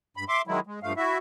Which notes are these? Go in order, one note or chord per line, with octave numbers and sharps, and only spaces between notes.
G2 B5
E5 C6 D6
D#3 F#3 G#3 E4
G#3
G2 F3 A3 F5
E4 F#4 E5